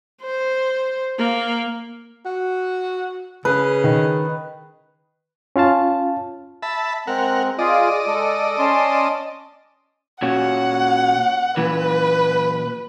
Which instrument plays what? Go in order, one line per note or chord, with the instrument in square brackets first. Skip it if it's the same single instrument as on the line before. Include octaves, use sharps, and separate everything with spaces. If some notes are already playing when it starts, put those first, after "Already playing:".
[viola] C5
A#3
[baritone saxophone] F#4
[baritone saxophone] C#3 [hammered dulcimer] B4
[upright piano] D#3 D#4
[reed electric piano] C#4 F4 F5 A5
[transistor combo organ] E5 A5 B5
[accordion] G#3 C4 [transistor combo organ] A#4 F#5
[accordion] F4 G#4 [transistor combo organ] D5 D#5
[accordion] G#3 A4
C#4 A5 C6
[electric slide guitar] A#2 C#4 F#4 [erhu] F#5
[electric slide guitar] A#2 E3 [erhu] B4